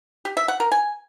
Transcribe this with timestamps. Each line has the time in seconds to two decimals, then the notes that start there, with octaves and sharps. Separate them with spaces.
0.25 G4
0.37 E5
0.48 F#5
0.60 A#4
0.72 G#5